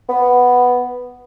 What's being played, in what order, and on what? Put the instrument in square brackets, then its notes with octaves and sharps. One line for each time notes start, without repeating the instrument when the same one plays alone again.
[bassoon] B3